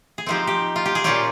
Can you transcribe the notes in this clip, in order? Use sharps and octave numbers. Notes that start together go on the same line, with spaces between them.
G#4
F3 G#3 C4 D#4 G4
G4
F4
G4
G#4
A#2 G3 C#4 F4 G4